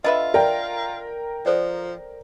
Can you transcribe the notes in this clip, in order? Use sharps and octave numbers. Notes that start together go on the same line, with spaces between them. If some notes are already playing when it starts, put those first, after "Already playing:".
D3 F4 B4 D#5 E5
A#4 D5 G5
F3 A4 C5 D5